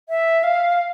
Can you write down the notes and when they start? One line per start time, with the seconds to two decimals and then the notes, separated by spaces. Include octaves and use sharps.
0.09 E5
0.43 F5